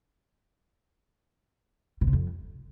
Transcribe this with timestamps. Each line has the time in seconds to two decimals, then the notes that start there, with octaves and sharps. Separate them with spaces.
2.01 B2
2.07 C3
2.13 F2